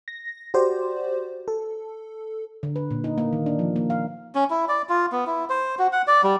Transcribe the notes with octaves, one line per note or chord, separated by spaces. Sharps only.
A#6
F#4 G4 C5 D5
A4
D3
B4
A#2
D#4
A#3
D#3
D4
F3
A#3
F5
C#4
E4
D5
F4
B3
E4
C5
F#4
F#5
D5
G3